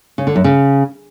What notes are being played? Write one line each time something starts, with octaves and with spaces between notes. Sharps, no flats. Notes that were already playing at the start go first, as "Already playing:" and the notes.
C#3
D3
F#2
C#3